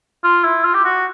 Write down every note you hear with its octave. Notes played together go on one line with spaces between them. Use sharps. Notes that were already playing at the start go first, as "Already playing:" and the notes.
F4
E4
F4
G4
F#4